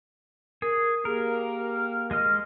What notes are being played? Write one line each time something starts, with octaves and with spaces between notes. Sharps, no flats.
G#4 A#4
A#3 G4 G#4 A#4
G#3 D#5 F6